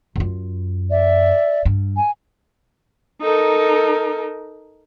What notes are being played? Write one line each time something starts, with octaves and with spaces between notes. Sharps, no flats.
F#2 F4
D5 E5
G2
G#5
D#4 A4 A#4